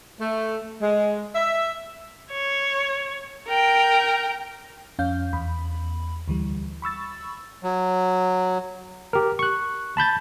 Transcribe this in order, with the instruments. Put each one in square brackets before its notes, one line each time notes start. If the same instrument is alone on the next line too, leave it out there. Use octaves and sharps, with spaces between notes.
[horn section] A3
G#3
E5
[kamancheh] C#5
A#4 G5
[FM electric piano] F2 C#4 F5 G6
E2 B5
D2 E3 G3
B5 C#6 E6 A6
[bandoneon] F#3
[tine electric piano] G4 A#4
C#6 F#6
A5 B5 G6 A6